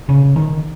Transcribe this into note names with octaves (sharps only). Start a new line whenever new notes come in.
C#3
D#3